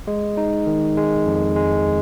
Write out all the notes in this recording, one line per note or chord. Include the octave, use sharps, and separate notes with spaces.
G#3
D#4
D#3
G#3
F2
G#3